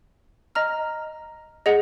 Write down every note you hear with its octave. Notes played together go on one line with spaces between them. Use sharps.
D#5 A#5 F6
G#4 D#5 F#5